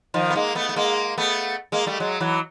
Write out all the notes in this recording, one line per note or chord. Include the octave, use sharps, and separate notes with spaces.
D#3 F3
B3
G#3 A#3
A3 B3
A3
G#3 A#3
A3 B3
G#3 A#3
G3 A3
F#3 G#3
E3 F#3